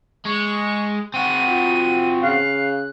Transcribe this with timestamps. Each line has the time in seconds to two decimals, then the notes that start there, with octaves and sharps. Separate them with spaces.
0.26 G#3 C#6
1.14 C4 F#4 D#7
1.48 F4
2.23 C#3 F5 F#6